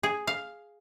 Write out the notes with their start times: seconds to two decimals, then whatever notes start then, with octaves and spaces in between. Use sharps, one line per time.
0.03 G#4
0.27 F5